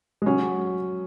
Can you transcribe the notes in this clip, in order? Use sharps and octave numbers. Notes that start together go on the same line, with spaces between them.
G#3
F#3 C#4